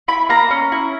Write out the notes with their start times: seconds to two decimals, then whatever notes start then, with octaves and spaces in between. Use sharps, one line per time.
0.08 E4 B5
0.29 A#3 A#5
0.51 C#4
0.72 E4